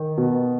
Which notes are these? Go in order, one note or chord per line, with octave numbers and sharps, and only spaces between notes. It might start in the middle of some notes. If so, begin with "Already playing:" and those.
Already playing: D#3
B2